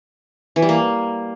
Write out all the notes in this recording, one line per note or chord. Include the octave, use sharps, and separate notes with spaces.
E3
G3
A#3